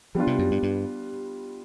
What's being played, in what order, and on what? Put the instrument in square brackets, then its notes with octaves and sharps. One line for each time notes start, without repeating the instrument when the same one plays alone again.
[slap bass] F3 [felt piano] G3 B3 D4 F4
[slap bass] C3
F#2
G2
G2